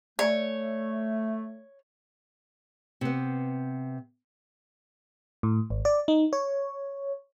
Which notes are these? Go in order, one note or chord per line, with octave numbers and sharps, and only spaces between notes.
A3 C#5 D5 G#5
C3 B3
A2
G#1
D5
D#4
C#5